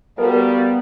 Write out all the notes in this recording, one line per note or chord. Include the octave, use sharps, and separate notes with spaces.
G3 B3 F#4 A4 A#4 F5